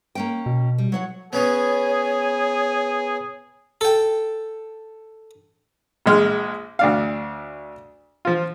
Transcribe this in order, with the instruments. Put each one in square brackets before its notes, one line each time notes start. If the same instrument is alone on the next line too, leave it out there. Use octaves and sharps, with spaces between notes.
[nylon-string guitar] A#3 C#4 G5
[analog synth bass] B2
[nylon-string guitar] G3
F#3 C#5 F#5
[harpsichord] B3 C#4 [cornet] G#4 [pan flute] C#5
[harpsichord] A4 G5
[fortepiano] A#1 G#3 F6
D2 D4 F5
F3 F4